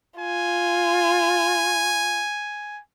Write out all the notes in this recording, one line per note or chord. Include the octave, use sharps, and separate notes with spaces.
F4 G#5